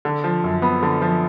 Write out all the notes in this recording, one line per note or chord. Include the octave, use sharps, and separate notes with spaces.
D3
F3
F#2
B3
D3
F3